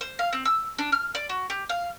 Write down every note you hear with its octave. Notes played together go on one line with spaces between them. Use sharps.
C5
F5
C4
E6
D4
F6
D5
F#4
G4
F5